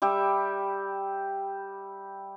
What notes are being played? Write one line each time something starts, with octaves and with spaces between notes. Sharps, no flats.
G3 G4 E5